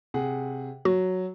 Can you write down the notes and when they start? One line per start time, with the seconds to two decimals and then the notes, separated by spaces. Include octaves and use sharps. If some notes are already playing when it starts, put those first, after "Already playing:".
0.14 C3 G#4 F#5
0.85 F#3 F#4